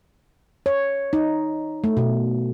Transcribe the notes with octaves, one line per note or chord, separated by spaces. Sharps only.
C#5
D#4
A3
B2